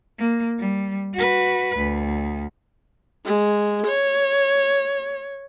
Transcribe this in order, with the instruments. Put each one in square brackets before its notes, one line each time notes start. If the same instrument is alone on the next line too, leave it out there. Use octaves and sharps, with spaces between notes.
[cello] A#3
G3
F#4 B4
D2
[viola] G#3
C#5